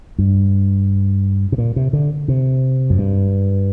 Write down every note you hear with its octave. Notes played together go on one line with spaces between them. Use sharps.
G2
C3
A#2
C3
D3
C3
F#2
G2